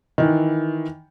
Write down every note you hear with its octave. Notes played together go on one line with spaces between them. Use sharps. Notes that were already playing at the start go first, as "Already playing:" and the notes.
D#3 E3